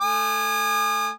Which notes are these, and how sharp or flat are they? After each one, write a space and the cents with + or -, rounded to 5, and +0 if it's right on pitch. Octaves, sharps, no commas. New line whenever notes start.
A3 +0 G#5 -10 D#6 -45